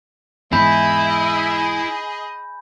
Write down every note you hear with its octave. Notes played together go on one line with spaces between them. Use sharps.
E2 G#2 E4 G#4 D#5 G#5 B5 G6